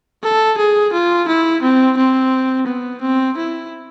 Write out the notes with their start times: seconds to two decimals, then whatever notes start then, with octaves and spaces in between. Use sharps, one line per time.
0.23 A4
0.58 G#4
0.93 F4
1.28 E4
1.63 C4
1.97 C4
2.67 B3
3.02 C4
3.37 E4